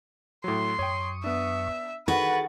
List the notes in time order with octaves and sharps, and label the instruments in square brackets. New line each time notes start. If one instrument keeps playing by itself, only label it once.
[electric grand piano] A2 F#3 [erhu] C6
[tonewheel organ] F#2 C#6 D#6 [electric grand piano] C#5 G5
[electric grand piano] B3 D4 [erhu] E5
[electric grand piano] D#3 [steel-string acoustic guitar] F#4 [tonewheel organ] G#4 A4 A6 [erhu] B4